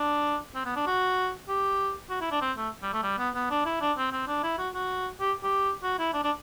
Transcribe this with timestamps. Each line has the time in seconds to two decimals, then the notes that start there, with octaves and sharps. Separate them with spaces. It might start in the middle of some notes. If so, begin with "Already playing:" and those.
Already playing: D4
0.55 C4
0.65 B3
0.76 D4
0.87 F#4
1.48 G4
2.10 F#4
2.21 E4
2.32 D4
2.41 C4
2.57 A3
2.82 G3
2.93 A3
3.03 G3
3.18 B3
3.35 B3
3.50 D4
3.65 E4
3.81 D4
3.97 C4
4.12 C4
4.27 D4
4.43 E4
4.58 F#4
4.75 F#4
5.20 G4
5.43 G4
5.83 F#4
5.98 E4
6.13 D4
6.24 D4